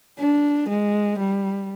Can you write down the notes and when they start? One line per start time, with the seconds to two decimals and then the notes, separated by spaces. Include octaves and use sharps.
0.19 D4
0.69 G#3
1.19 G3